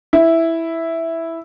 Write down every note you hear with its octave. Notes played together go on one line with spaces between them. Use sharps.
E4